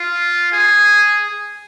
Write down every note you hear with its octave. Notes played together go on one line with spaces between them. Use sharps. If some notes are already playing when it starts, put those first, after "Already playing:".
Already playing: F4
G#4